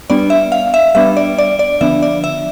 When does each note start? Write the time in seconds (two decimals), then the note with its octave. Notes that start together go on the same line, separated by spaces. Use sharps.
0.10 G3 B3 D4 D5
0.30 E5
0.52 F5
0.74 E5
0.95 G3 B3 D4 E5
1.17 D5
1.38 D5
1.59 D5
1.81 D3 F3 B3 D4 E5
2.03 D5
2.24 E5